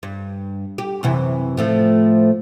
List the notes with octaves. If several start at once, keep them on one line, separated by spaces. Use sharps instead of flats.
G2
G4
F#2 C3 E3
A2 F3 A3